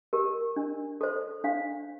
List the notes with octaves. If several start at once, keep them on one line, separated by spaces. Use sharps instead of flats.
G4 A#4
D4
A4 C5
D4 F5